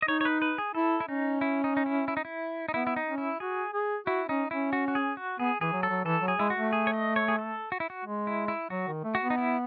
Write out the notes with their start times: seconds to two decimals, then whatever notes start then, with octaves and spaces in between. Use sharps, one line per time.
0.02 D#5
0.08 D#4 C#5
0.21 C#5
0.25 B4
0.42 B4
0.58 G#4
0.75 E4 A4
1.00 E4
1.08 C#4 D#4
1.41 E4
1.64 D#4
1.77 D#4
1.86 E4
2.08 E4
2.17 D#4
2.25 E4
2.69 D#4
2.74 B3 E4
2.87 E4
2.96 D#4
3.07 C#4
3.18 E4
3.40 F#4 G#4
3.74 G#4
4.06 E4 F#4
4.28 C#4 D#4
4.51 C#4 E4
4.73 F#4
4.88 F#4
4.95 G#4
5.17 F#4
5.39 B3 G#4
5.61 E3 G#4
5.73 F#3
5.83 A4
5.89 F#3
6.05 E3 A4
6.22 F#3
6.28 G#4
6.39 G#3 E4
6.50 F#4
6.55 A3
6.73 G#4
6.87 C#5
6.93 D#5
7.16 C#5
7.28 G#4
7.39 A4
7.72 F#4
7.80 E4
7.90 F#4
8.05 G#3
8.27 E4
8.48 E4
8.70 F#3 F#4
8.87 D#3
9.04 A3
9.15 F#4
9.21 B3
9.30 D#4
9.38 E4